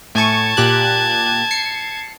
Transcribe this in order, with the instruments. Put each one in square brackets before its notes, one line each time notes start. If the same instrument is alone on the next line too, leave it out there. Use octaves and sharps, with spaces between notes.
[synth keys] A2 G#5 C#6 [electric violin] A5 G#6
[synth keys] A#2 G4 F#6
C7 C#7